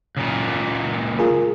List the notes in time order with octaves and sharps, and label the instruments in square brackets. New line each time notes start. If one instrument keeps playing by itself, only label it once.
[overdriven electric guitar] C#2 A#2
[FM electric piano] F4 G#4 A#4